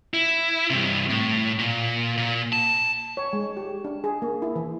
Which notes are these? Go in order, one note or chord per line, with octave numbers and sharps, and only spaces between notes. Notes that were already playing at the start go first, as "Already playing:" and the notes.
E4
G2 C3
A2
A#2
A#2
A5
C#5
G#3
G4
D4
G#4
A#3
E4
E3